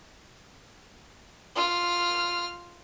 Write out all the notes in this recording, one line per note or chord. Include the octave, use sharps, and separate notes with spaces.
F4 F6